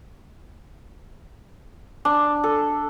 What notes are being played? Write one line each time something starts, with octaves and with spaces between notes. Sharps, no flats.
D4
A4